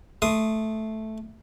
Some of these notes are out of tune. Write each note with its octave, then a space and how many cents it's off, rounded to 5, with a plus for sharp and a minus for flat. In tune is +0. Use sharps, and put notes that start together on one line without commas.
A3 -5 C6 -5 D#6 +0